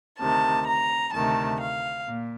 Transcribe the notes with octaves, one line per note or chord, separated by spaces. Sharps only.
D2 C3 D#3 A5
A#5
D2 C3 D#3 A3 A5
F5
A#2